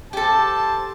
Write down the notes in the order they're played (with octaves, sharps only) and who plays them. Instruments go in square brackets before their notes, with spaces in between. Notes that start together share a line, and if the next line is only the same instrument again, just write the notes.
[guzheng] G4 A4 [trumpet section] C5 A5